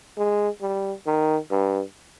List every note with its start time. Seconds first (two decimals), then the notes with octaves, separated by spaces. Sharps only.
0.18 G#3
0.62 G3
1.07 D#3
1.51 G2